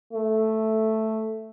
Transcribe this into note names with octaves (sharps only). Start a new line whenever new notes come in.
A3